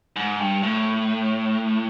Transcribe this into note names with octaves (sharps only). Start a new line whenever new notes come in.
G#2
G2
A2